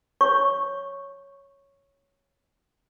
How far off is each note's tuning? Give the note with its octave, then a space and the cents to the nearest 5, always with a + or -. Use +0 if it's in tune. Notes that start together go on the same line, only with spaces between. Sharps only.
C#5 +0 C#6 -5